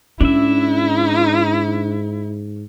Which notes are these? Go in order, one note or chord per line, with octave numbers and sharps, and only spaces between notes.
G#2 C#4 D4 E4 E5